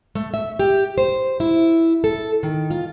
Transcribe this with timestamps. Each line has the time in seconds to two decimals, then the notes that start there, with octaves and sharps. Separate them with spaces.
0.15 A3
0.34 E5
0.59 G4
0.98 C5
1.40 E4
2.04 A4
2.43 D#3
2.70 F4